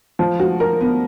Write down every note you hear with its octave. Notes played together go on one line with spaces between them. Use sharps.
F3
F#4
A#4
B3